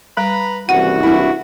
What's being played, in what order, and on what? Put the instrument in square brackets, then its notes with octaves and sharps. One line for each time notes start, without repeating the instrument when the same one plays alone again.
[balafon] G3 [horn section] B4 A#5 B5
[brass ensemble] F#1 C2 E3 [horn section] F#4 [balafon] F#5
[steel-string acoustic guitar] D4 E4